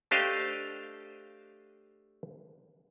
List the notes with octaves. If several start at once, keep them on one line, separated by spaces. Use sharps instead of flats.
A3 D4 G4 C5 D#5 F5